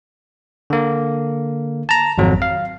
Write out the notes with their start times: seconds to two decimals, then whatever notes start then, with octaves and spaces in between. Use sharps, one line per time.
0.70 D3 A#3
1.89 A5 A#5
2.18 G#1 F2 F#3
2.42 F5